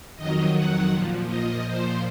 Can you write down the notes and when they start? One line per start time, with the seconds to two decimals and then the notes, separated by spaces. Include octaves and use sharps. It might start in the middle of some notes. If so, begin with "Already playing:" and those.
0.16 F2 D#3 F#3 D#5
0.54 F#5
0.91 A#2 F3
1.28 D#5
1.66 A#2 F3 C5